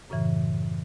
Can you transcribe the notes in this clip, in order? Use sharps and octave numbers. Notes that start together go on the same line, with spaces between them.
F#2 A2 C#3 E3